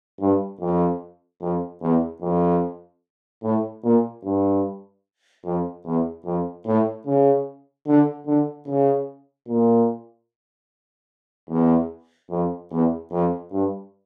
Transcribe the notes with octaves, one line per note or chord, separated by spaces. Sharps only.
G2
F2
F2
E2
F2
A2
A#2
G2
F2
E2
F2
A2
C#3
D3
D3
C#3
A#2
E2
F2
E2
F2
G2